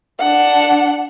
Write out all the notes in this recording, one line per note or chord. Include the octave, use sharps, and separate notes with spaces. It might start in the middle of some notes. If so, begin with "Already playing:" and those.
D4 F#5